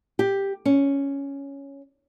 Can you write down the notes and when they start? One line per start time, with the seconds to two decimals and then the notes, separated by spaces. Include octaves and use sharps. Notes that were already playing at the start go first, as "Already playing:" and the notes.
0.19 G4
0.65 C#4